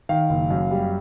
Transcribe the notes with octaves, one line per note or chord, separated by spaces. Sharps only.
D#3 F5
F#1
F#2
G3